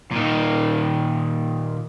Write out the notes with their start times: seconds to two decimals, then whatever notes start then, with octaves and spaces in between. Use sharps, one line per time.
0.11 A#2 D#3